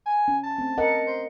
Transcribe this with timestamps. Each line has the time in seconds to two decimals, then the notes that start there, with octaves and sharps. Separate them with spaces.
0.06 G#5
0.28 C#4
0.44 A5
0.58 A3 C4
0.78 A#4 D#5 F#5
1.07 C5